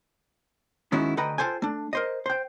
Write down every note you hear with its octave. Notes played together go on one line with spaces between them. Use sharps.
G#2 D#3 C#4 E4 F#4
D2 A4 B4 D#5 G5 A#5
F4 A4 C5 G5 G#5
A3 D4
A#4 C5 D#5
C5 G5